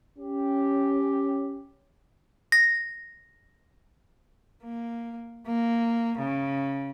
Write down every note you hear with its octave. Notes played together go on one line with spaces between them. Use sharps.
C#4 G4
A#6
A#3
A#3
C#3